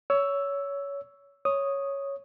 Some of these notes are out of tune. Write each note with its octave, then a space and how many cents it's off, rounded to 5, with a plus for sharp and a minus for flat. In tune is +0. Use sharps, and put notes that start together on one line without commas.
C#5 +20 E6 +0
C#5 +0 D#6 +0